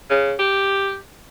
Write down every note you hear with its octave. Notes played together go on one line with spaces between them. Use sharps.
C#3
G4